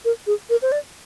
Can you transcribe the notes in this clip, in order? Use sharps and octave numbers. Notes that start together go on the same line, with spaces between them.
A#4
G#4
A#4
C5
D5